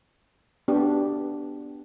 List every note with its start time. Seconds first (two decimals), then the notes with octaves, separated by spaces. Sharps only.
0.68 B3 D4 G4